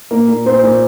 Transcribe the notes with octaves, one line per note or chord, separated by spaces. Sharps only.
A#2 A#3 A#4
A#2
A#2 C4 C5
A#2